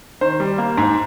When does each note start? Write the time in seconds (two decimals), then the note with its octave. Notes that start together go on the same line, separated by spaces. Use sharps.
0.21 D#3 C5
0.40 G3
0.58 A#3
0.77 G#2